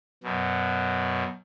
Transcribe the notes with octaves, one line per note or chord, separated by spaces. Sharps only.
F#2 B2